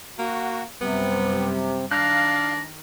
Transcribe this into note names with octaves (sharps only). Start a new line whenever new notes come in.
A#3 F#4
F#2 C3 G3 B3
D#3 D4 F5 A#5 F#6